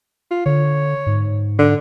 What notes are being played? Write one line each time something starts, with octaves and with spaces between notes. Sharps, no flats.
F4
D3 C#5
G#2
D3